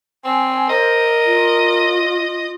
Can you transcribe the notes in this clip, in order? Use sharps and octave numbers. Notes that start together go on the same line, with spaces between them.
C4 G#5
A#4 C5 D#5
F4